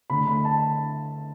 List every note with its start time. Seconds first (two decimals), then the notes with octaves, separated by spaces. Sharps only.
0.10 D3 A3 B5
0.27 B5
0.45 A5